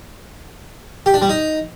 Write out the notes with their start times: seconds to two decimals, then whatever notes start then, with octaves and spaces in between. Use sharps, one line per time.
1.06 G4
1.14 D4
1.22 G3
1.29 D#4